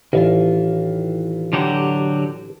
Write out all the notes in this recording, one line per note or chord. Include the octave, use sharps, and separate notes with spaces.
A1 D#3 E3 F4
D3 F#3 G4